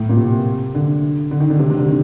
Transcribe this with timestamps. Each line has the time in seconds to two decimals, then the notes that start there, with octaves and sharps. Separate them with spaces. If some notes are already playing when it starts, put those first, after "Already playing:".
Already playing: A2
0.09 A#2
0.17 C3
0.75 D3
1.31 D3
1.40 D#3
1.50 D3
1.59 C3
1.69 C3
1.79 D3
1.88 D#3